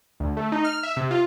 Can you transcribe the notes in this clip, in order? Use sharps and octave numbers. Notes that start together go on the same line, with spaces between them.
D2
A3
D#4
F6
E5
C3
F4